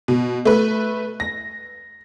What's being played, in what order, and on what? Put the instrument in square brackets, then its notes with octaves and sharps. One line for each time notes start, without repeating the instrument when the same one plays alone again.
[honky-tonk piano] B2
A3 B4
A#6